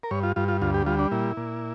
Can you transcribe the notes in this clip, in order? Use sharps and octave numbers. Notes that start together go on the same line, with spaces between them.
A#4
G2 C#5
F4
G2 F4
F4
D2 F4
G4
G3 F4
D4
A#2 E4
A#2